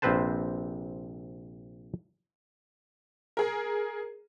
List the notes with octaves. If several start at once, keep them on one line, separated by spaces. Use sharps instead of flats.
A#1 C3 C4 B4 C5 A5
G#4 A#4